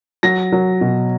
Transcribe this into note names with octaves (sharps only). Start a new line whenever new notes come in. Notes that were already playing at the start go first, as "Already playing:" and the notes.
F#3 A#6
F#3
B2